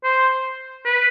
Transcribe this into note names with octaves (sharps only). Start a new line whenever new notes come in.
C5
B4